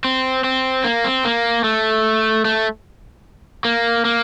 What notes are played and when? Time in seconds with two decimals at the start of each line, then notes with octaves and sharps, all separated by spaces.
0.05 C4
0.44 C4
0.84 A#3
1.04 C4
1.25 A#3
1.64 A3
2.45 A3
3.65 A#3
4.05 A#3